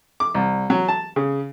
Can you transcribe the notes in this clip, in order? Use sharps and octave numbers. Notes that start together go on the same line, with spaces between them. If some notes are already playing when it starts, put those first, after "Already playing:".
D6
C2
F#3
A5
C#3